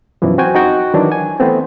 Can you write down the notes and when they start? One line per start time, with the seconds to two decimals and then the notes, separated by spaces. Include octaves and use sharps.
0.22 F#2 B2 E3 F3
0.38 C4 F#4 G5 G#5
0.55 D#4 F#4 G5
0.94 D#3 E3 F#3 D4
1.12 G#5
1.40 E3 A3 B3 C4